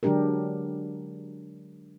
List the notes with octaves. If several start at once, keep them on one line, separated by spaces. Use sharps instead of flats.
D3 F#3 G#3 D4 G4 A#4